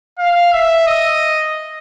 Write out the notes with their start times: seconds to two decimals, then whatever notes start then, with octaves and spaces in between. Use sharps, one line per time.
0.19 F5
0.53 E5
0.87 D#5